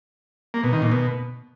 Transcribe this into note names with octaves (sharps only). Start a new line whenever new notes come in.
A#3
B2
D#3
A#2
B2